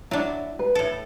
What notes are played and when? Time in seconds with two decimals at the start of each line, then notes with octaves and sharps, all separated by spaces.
0.11 F#3 D4 E4
0.59 B4
0.75 A2 A4